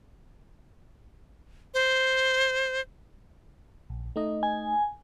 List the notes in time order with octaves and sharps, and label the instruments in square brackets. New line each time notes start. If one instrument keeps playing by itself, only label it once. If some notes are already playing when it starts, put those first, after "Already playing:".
[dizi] C5
[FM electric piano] A#1
A3 D#4 D#5
[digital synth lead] G#5